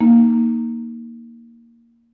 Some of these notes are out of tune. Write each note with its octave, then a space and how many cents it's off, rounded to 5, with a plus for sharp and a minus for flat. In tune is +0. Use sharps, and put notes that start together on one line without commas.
A#3 +0 D#4 +0